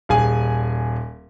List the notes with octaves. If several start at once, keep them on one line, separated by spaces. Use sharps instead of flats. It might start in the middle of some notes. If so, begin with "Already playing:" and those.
D#1 G#4 G#5